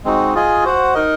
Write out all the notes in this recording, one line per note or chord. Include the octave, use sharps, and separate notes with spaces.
G#3 C4 D#4 F#4
F4 G#4 D#5 G#5
F#4 C5 F#5
D#4 A#4 D#5